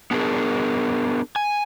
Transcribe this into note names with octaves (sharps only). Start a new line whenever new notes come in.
B3 D4 G#4 A#4
G#5